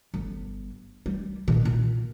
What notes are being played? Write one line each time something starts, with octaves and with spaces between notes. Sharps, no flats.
G1
G3
A#2 D#3
A#2